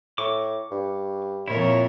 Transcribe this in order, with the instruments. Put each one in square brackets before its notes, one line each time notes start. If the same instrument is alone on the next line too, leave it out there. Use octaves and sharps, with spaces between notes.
[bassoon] A2 [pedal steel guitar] C#6 D6
[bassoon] G2
[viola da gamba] F2 A#2 A#4 [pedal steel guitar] E4 [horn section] C#5